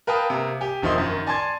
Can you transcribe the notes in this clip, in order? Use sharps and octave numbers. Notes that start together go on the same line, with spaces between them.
A#4 B4 F5 G5 A5 D#6
C3 A#3
G4 G#5
E1 D#3 F3 D#4 E5 C6
F#2 D#3
D5 G#5 A5 C6 G#6 A6